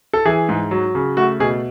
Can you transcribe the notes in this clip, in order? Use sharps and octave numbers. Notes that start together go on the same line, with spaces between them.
A4
E3 G#4
G#2
F#3
C#3
A3 F#4
B2 G#4